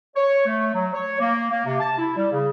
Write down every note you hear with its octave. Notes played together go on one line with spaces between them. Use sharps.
C#5
A3
F#3
C#5
A#3
A#3
C3
A5
E4
G3
C#3